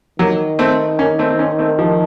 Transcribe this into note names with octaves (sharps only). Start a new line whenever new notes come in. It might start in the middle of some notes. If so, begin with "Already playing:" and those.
D#3 F#3 A#3
A3 C4
A#3 C#4
A3 C4
C4
A#3 C#4
A3 C4
F3 A3